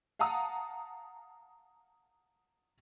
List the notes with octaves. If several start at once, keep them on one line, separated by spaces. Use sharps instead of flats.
F5 F#5 A5 A#5 D#6